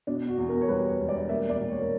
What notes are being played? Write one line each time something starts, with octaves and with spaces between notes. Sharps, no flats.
B2 D4
F#4
E2
A#4
C#5
G3 B4
C#5
E1
D5
A#3 E5
D5
A#2
C#5
A#4